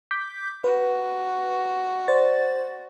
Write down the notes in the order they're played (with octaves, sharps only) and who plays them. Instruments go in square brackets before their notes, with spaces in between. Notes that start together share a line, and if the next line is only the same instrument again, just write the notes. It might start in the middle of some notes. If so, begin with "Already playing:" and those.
[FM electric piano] D6 G6 B6
[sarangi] F#4 [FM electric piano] B4
[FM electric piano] C5 D5 A6